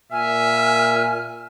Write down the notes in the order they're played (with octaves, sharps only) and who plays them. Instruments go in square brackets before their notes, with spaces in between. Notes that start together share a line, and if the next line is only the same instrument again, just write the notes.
[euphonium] A#2 [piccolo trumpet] E5 [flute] G#5 [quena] F6